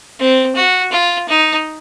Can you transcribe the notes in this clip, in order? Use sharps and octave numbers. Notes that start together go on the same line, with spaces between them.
C4
F#4
F4
D#4